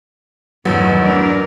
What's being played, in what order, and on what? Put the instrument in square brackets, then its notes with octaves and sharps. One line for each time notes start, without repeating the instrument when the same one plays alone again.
[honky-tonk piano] A1 E2 E6 [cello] G2 D#3 [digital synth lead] F#3 [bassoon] B3
[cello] D4 A#4